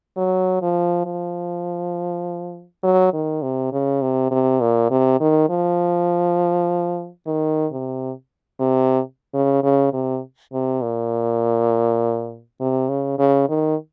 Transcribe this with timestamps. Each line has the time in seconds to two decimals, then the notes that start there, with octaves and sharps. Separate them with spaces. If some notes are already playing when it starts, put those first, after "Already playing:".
0.17 F#3
0.62 F3
1.05 F3
2.83 F#3
3.13 D#3
3.42 C3
3.72 C#3
4.02 C3
4.31 C3
4.61 A#2
4.90 C3
5.20 D#3
5.49 F3
7.27 D#3
7.72 C3
8.60 C3
9.34 C#3
9.63 C#3
9.93 C3
10.53 C3
10.82 A#2
12.60 C3
12.89 C#3
13.18 C#3
13.49 D#3